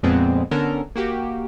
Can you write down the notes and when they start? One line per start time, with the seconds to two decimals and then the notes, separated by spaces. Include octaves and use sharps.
0.03 F2 A#2 G#3 B3 C4
0.51 D3 B3 C#4 A4 A#4
0.95 A#3 F#4 G4